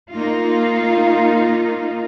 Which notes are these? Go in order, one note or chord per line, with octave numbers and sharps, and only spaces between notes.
A#3 D#4 F4